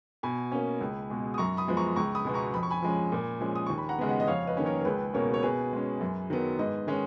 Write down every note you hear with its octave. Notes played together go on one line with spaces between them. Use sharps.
B2 G#5 B5
A#3 C#4
C#2
B2 G#3
D#6
F#2 A#5 C#6
B5 D#6
F3 G#3 B3
A#5 C#6
C#2 A#5 C#6
B5 D#6
B2 G#3 B3
A#5 C#6
F2 B5
C#6
G#5 B5
F3 G#3 C#4
A#2
F3 G#3 C#4
D#6
D#2 C#6
B5
F#5 A#5
C#3 G#3 B3
D#5 F#5
D#5
F2 C#5 F5
B4 D#5
D#3 A#3 C#4
A#4 C#5
A#4
C#2 G#4 B4
B2 A#3 C#4 A#4 C#5
C#5
B2 G#4 B4
G#3 C#4
F#2
D#3 F#3 B3
G#2 B4 D#5
D#3 G#3 C#4